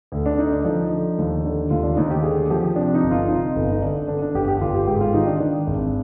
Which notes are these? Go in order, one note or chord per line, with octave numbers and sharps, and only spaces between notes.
D2
D4
D3 D#4
D4
F3 D#4
D3
D#2
D3
D#2 F4
D4
D#2 D#4
G4
D3 G#4
F3 G4
C3 D4
D#4
G1
F4
C3 D#4
G1
D#4
D3 D4
D3 D4
D4
G1 G4
G4
G1 F4
G4
G#2 G4
F4
D#3 D#4
D4
D#3 D4
G#1